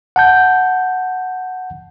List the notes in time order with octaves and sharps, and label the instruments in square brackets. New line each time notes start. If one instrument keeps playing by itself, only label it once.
[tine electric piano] F#5 A5 G6